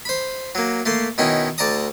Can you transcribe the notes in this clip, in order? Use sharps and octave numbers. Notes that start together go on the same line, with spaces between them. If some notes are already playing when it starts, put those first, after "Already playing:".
C5 B5
F#3 A#3
A3 A#3 C6
B2 D#3 C#4 D#4 E4
D2 D5 A5 A#5 D#6